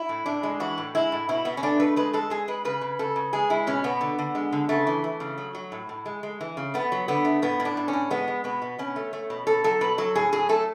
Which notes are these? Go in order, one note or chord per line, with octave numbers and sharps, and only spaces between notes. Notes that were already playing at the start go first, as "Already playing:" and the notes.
Already playing: E4
A2
A2 D4
G#3
E3 F#4
A2
G#3 E4
A2
B2 E4
B2 B3
C#4
A3 D4
A3 B4
G#3 B4
G#3 A4
G#3 G#4
G#3 B4
C#3 B4
C#3
C#3 A4
C#3
G#3 G#4
G#3 E4
B2 C#4
B2 B3
D3
D3
G#3
D3
C#3 A3
E3
E3
C#3
F#3
F#3
A2
A2
G#3
G#3
E3
C#3
A3 B3
F#3
D3 B3
A3
A2 B3
A2
D4
A2
C#4
A2
G#3 B3
G#3
B2 B3
B2
B2 C#4
A3
A3
B2
B2 A4
F#3 A4
B2 B4
F#3 A4
A2 G#4
F#3 G#4
A3 A4